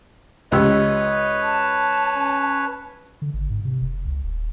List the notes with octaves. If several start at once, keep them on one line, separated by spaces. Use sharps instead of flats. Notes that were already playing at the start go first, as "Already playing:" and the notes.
C#2 G4 B4 C#5 D#5 E6
A5
C#4
D3
G#1
G#2
C3
F1
C#2
D#1